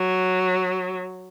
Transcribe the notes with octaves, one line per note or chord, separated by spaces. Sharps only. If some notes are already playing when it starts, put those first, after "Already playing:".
Already playing: F#3